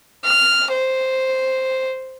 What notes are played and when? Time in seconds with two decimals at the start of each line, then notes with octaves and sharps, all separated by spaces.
0.25 F6
0.72 C5